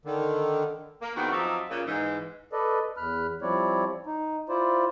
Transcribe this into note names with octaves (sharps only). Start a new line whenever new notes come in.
D3 D#3
A#3
E2 D#3 B3 C4 F#4
F3 F#3 C4 D#4 D5 E5
A#2 C#3
G#2 E3
A4 B4 D5 D#5
E2 B5 F6 F#6
F3 G3 C4 E4 C#5 D5
D#4
E4 F4 C5 D5